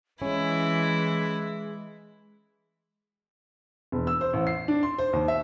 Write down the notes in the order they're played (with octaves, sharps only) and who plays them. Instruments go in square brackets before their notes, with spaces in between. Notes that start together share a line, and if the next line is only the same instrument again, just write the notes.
[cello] E3 [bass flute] G#3 [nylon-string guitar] C#4 [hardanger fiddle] E4
[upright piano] E1
E6
C5
A1
C7
D4
C6
C5
D#2
E5